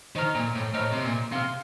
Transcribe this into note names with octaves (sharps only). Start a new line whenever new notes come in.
D#3 C5 D#5 A#5 F6
A#2
A2
A2 C5 D#5 A#5 F6
C3
A#2
C3 F5 C6 F6